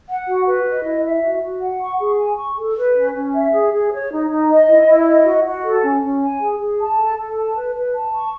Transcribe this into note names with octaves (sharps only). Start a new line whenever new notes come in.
F#5
F#4
B4
D#5
E4
E5
F#4
F#4
F#5
C#6
G#4
G#5
C#6
A4
B4
C#4
C#4
E5
G#4
G#4
C#5
D#4
D#4
D#5
E4
E4
D#5
F#4
F#4
A4
C#4
C#4
G#5
G#4
G#4
A5
A4
A4
A5
B4
B4
A5
C#6